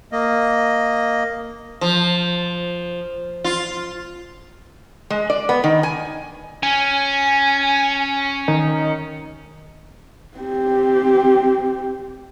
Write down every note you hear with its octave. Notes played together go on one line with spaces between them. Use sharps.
A#3 D#5
F3
F4
G#3
D5
B3
D#3
G#5
C#4 G#5
D#3
C4 G4